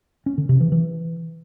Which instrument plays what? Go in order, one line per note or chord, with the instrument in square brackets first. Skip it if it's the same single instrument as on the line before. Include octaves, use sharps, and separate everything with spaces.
[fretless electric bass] C#4
D3
C3
E3
E3